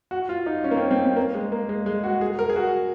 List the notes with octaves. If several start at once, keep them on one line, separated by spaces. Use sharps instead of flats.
F#4
F4
D#4
C#4
A#3
C4
C4
C4
A#3
G#3
A#3
G#3
G#3
F#4
G#4
A#4
G#4
F#4